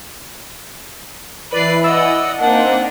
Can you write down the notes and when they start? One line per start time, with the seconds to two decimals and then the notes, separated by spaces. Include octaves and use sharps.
1.51 E3 E4 B4 D5 C7
1.83 D5 D#5 F#5 E6
2.39 A#3 C4 D4 D#4 F#5